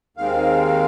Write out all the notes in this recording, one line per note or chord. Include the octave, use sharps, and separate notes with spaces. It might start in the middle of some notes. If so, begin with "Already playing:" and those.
D#2 D#3 G#3 C4 F5